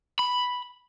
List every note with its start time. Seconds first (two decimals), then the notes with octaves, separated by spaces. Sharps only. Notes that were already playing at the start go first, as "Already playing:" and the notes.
0.19 B5